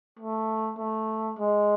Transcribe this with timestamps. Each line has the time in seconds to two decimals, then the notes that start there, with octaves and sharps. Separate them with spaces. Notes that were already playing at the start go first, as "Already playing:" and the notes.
0.19 A3
0.79 A3
1.39 G#3